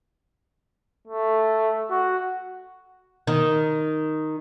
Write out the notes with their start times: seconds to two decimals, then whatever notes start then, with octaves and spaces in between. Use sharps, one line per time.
1.07 A3
1.91 F#4
3.27 D#3